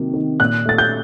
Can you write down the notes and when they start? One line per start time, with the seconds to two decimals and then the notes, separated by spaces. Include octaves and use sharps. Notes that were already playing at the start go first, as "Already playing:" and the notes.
Already playing: C3 D#3 F#3 A#3
0.14 D#3
0.40 A#2 F#6
0.65 A3 A6
0.78 G6